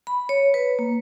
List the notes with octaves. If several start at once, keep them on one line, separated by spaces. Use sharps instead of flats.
B5
C#5
B4
A#3